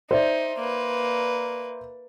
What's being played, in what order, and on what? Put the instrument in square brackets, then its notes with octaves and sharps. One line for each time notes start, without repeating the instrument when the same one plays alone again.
[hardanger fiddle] D#4 [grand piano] C5 D5 E5
[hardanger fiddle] A#3 B4